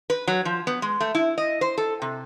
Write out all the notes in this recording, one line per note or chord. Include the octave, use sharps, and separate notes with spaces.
B4
F#3
F3
B3
G#3
A3
E4
D#5
C5
A4
C3